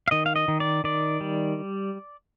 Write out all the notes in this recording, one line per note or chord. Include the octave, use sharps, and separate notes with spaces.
F5
D#3 D#5
F5
D#5
D#3
D5
D#3 D5
G3